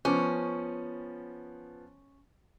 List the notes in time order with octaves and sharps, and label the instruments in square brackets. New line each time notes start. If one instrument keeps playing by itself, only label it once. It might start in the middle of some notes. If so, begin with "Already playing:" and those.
[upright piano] F3 B3 [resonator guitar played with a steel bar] C#4